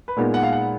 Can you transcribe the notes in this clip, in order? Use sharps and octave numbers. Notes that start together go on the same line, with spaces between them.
B4
A#2 G#3 B3 D#4 A#4
F#5
F5
F#5